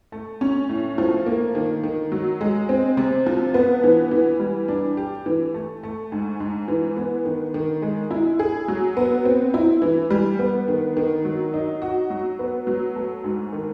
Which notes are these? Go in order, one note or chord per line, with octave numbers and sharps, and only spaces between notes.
A3
C#4
A2
F3
A#3
D#3
D#3
F#3
G#3
C4
C3
F3
B3
E3
E3
G3
D4
G4
E3
A3
A3
G#2
G#2
E3
B3
D#3
D#3
G#3
E4
G#4
F#3
B3
C4
E4
E3
G3
B3
D#3
D#3
F#3
D#4
F#4
F#3
B3
F#3
A3
G#2
D#3